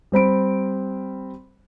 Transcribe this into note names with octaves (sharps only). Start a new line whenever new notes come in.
G3 C4 B5 D7